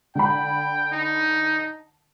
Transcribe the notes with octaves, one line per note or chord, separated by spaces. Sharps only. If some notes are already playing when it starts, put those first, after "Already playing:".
D3 G5 B5
D#4